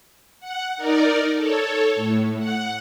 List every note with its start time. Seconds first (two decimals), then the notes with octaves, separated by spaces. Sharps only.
0.40 F#5
0.77 D#4 A#4 D5
1.35 A4 C#5
1.95 A2
2.38 F#5